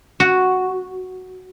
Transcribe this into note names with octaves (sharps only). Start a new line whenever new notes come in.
F#4